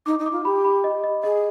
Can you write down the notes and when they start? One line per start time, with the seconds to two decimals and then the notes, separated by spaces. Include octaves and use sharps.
0.06 D#4 D6
0.19 D#4
0.26 D6
0.32 F4
0.45 G4 B5
0.64 B5
0.84 D#5
1.04 D#5
1.23 G#4 D#5